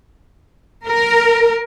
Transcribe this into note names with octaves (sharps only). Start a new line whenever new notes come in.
A#4